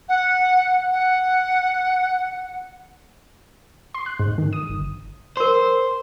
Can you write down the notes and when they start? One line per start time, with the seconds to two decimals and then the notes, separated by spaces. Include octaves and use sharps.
0.08 F#5
0.92 F#5
3.94 C6
4.06 F#6
4.19 G#2
4.38 D#3
4.53 D#6
4.69 G1
5.37 A#4 C5 C6